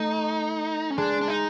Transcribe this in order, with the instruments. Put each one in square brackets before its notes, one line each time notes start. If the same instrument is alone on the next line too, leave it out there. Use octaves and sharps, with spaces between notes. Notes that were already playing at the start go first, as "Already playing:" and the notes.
Already playing: [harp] A3 [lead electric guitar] D#4
[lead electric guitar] C#4
[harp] G#3 [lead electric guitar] D4
[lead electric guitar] D4
D#4